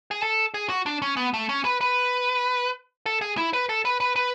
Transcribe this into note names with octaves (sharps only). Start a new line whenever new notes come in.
G#4
A4
G#4
F#4
D4
C#4
B3
A3
C#4
B4
B4
A4
G#4
E4
B4
A4
B4
B4
B4